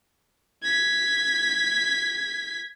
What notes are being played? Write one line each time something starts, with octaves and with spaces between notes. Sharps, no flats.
G#6 B6